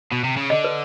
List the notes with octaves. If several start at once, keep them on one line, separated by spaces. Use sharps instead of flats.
B2
C3
C#3
D3 D#5
B4